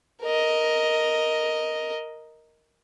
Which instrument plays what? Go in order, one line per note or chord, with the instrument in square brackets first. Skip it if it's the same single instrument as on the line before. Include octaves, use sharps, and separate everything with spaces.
[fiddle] A#4 D#5